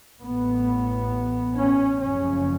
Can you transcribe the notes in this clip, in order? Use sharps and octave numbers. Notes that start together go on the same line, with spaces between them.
A1 A2 B3
C#4
F#1 F2 C#3 C#4